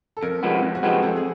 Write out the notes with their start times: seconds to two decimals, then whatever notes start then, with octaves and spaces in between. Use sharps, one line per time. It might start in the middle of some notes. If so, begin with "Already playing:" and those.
0.17 A4
0.22 F2 A#4
0.43 C3 F3 G#3 B3
0.62 F2
0.75 F#4
0.83 C3 F3 G#3 B3 G4
0.94 G#4
1.03 F2 A4
1.16 G#4